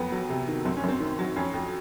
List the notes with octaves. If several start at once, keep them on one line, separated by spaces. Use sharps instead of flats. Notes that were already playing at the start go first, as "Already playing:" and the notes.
Already playing: F2 F#3 B3
F#3
C3
D#3
F#2 C4
C#4
F#2
C4
D#3
F#3
F2 C#4
F2